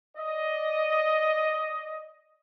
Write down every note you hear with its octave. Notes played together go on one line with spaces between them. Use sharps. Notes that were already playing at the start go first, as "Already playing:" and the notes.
D5 D#5